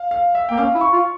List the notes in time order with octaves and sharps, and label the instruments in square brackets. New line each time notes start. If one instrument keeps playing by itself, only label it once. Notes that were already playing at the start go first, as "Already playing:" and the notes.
Already playing: [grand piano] F5
F5
E5
[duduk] A#3 [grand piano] G5
[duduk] C#4 [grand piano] F5
[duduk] E4
[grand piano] C#6
[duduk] F4